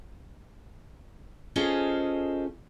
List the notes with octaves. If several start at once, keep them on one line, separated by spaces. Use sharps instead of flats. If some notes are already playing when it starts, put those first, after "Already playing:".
C#4 F4 G#4 A4 C5 D#5